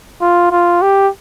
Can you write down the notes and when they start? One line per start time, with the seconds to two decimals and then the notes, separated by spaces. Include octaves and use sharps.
0.22 F4
0.51 F4
0.82 G4